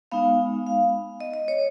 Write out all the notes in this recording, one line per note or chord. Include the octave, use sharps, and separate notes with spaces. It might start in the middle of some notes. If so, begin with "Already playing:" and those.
G#3 B3 D#4 F5
F5
D#5
D#5
C#5